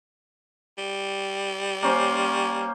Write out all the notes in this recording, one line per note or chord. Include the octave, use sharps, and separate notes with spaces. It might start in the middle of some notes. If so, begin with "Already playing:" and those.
G3
A#3 C#4 C5